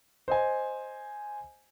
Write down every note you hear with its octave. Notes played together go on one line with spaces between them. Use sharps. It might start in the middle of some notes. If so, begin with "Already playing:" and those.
C5 D#5 G#5